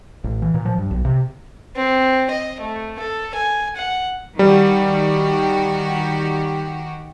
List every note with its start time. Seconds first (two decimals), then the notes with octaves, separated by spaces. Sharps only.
0.24 A1
0.42 E3
0.54 A#2
0.65 F3
0.78 G2
0.91 B1
1.05 C3
1.76 C4
2.30 D#5
2.61 A3
3.00 A4
3.34 G#5
3.76 F#5
4.39 D#3 G3 F#4 G4